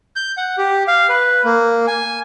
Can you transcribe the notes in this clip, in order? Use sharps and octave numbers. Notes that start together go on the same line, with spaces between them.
G6
F#5
G4
F5
B4
A#3
G#5